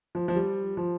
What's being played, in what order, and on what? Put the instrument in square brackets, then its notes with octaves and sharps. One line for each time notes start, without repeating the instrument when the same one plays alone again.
[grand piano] F3
F3
G3
F3